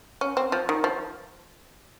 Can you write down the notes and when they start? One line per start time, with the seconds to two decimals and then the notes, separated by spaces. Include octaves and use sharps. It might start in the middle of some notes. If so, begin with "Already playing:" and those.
0.21 C#4
0.37 C4
0.52 F3
0.69 D#3
0.84 F3